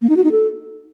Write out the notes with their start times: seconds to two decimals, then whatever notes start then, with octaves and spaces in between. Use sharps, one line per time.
0.02 A#3
0.09 D#4
0.17 F#4
0.24 D#4
0.32 A4